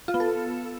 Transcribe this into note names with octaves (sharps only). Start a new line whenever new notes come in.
F4
B3
A4